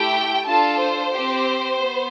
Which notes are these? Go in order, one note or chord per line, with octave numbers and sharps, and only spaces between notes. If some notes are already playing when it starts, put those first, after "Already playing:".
Already playing: A3 E4 G4 G5
D4 F4 A4 A5
C5
C4 G4
B3